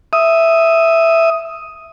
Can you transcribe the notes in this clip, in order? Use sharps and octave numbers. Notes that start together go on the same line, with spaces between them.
E5 D#6